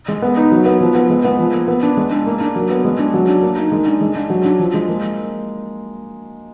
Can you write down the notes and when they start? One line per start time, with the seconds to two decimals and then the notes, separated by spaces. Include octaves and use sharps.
0.08 G#3
0.22 B3
0.37 D#4
0.52 F#3
0.66 B3
0.80 F3
0.95 B3
1.10 G#3
1.24 B3
1.39 F3
1.53 A#3
1.68 B3
1.83 D4
1.97 G#3
2.12 D4
2.26 A#3
2.40 D4
2.55 F#3
2.70 B3
2.85 G#3
2.99 D4
3.14 F#3
3.28 D4
3.42 A#3
3.57 D#4
3.72 G#3
3.87 D4
4.01 G#3
4.15 D4
4.30 F#3
4.45 D4
4.59 F3
4.74 G#3
4.88 A#3